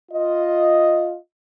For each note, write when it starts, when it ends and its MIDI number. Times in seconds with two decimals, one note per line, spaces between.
0.12 1.17 65
0.12 1.17 75